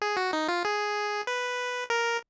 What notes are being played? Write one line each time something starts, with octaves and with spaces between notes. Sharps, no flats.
G#4
F#4
D#4
F4
G#4
B4
A#4